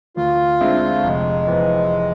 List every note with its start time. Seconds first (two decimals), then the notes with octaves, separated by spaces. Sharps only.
0.17 D2 F4
0.61 D3 G#3 C4 E4
0.94 A3
1.03 F1 G#3
1.47 F2 E3 B3